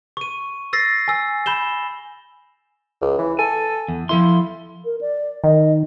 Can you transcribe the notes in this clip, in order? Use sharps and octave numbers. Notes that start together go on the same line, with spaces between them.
C#6 D#7
E6 A6 A#6 C7
G#5 E6
B5 G6 E7 G7
C#2
E3
A4 G#5
E2
F3 E4 A4 C6
A#4
D5
D#3 D#5